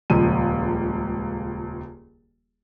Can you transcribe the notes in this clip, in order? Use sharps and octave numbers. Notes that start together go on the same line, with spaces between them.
D#1 C#2 F3 D#7